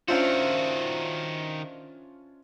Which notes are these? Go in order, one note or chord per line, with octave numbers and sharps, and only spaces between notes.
D#3 C#4 D4 F4 F#4 C5 E5 F5